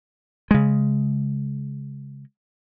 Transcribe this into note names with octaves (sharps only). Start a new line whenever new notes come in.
C#3 G#3